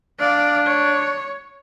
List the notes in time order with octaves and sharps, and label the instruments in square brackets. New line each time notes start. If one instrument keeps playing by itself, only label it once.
[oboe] D4 [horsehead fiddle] D5 F5
[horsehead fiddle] C#5